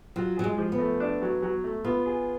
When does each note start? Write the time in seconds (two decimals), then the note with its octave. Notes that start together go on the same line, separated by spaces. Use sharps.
0.16 F#3 F4
0.36 F#3 G#4
0.44 G#3
0.58 F3
0.72 B3
0.79 A3
1.00 D4
1.22 F#3
1.42 F#3
1.64 A3
1.84 B3 F4
2.06 G#4